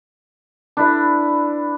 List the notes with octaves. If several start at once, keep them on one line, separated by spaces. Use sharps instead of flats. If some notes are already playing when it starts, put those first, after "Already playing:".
D4 E4 B4